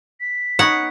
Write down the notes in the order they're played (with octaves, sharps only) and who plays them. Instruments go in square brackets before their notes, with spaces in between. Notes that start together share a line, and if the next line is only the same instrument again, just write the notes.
[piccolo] B6
[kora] B3 D#4 C#5 [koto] F#5